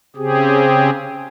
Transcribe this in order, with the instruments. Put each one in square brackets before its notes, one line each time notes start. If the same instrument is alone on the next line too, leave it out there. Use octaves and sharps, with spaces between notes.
[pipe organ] C#3 C4 G4 G#4